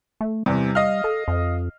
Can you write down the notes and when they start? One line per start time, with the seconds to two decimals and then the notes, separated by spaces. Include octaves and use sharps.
0.21 A3
0.46 E2 C3 G3
0.75 D#5 F5 F6
1.04 A4
1.28 F2